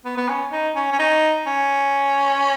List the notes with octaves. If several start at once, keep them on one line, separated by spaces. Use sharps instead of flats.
B3
B3
C#4
D#4
C#4
C#4
D#4
C#4